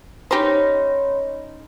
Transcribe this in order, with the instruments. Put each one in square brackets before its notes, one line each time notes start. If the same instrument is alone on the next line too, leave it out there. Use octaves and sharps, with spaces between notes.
[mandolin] C#4 D#4 [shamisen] G4 C5 [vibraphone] C#5 B5 C6